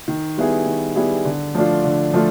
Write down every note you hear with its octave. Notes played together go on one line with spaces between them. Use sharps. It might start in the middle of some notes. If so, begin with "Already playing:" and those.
D#3
G3 B3 E4 G#4
D#3
G3 B3 E4 G#4
D3
F3 A3 D4 F4
D3
F3 A3 D4 F4